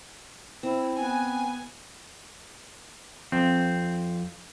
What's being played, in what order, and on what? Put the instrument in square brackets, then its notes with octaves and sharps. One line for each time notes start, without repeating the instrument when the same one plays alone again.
[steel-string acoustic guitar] C4 [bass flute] E4
[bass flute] B3 [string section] G#5
[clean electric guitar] F2 C4